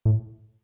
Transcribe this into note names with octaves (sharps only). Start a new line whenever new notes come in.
A2